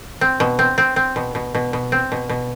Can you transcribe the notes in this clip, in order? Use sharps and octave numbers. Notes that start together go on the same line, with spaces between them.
C4
B2
C4
C4
C4
B2
B2
B2
B2
C4
B2
B2